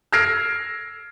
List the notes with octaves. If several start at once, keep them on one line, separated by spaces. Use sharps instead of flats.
E6 F6 G#6 A#6 C7 D7